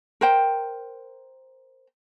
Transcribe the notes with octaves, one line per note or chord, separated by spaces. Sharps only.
A#4 C5 G5